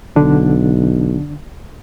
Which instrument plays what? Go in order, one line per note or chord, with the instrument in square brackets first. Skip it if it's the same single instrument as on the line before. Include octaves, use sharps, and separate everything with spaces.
[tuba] B1 [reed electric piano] D3 D4